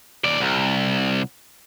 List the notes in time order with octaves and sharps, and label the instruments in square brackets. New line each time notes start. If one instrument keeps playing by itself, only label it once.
[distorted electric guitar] D#2 D5
C2